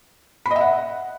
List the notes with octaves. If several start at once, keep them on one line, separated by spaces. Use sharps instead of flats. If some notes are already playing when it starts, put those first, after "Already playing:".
B5
D#5
E5
F#5